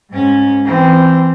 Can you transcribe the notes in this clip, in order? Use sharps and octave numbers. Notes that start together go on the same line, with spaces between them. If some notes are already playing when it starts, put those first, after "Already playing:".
G#2 C#4
E3 C4